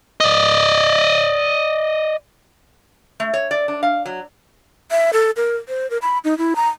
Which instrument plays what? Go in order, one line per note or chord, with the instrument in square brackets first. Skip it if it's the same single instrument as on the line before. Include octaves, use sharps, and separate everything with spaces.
[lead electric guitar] D5 D#5
[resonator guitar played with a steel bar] A3
C#5
D5
D4
F5
F#3
[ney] E5
A4
A#4
C5
A#4
B5
D#4
E4
A#5